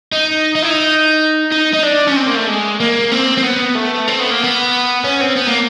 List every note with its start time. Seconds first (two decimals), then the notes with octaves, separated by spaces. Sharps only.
0.12 D#4
0.55 D#4
0.63 E4
0.71 D#4
1.52 D#4
1.73 D#4
1.83 D4
2.07 C#4
2.16 C4
2.27 A#3
2.37 A3
2.47 G#3
2.80 A#3
3.12 C4
3.38 C4
3.43 B3
3.75 A3
4.08 C4
4.20 B3
4.31 A#3
4.44 B3
5.04 C#4
5.21 C4
5.36 B3
5.47 A#3